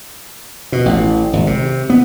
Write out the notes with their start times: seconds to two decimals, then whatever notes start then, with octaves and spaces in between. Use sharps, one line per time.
0.72 B2
0.86 A1
1.33 G#1
1.47 C3
1.90 B3